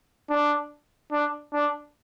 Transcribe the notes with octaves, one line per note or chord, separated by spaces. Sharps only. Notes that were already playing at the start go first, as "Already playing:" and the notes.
D4
D4
D4